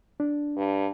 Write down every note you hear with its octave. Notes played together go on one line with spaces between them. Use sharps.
D4
G2